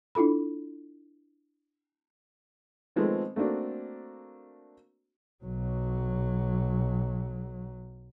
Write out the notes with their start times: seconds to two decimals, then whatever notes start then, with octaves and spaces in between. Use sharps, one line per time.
0.15 D4 E4 F4 A4 B5
2.96 D#3 F3 G#3 A3 B3 C4
3.36 A3 A#3 C4 D4 F#4
5.45 B1 F#3